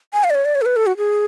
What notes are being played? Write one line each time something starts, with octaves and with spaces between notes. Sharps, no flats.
G#5
F5
D5
C#5
D5
C#5
A4
B4
A4
F#4
G#4